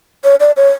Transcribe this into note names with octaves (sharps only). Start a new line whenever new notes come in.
C#5
D5
C#5